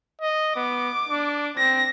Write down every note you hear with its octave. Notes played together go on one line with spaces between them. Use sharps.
D#5
B3 D6
D4
C4 A#6